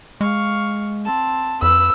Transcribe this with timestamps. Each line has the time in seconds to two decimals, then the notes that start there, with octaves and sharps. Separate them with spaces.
0.21 G#3 F5 C#6
1.05 C4 A5
1.62 F2 B4 E6